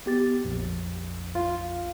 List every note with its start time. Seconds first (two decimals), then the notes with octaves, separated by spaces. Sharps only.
0.06 B3 G4 A6
0.45 A#1 F2
1.35 F4